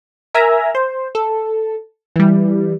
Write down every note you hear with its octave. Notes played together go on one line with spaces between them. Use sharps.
A#4 E5 G#5 A#5
C5
A4
E3 G3